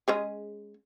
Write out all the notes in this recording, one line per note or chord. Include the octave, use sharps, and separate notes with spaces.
G#3 C#4 G#4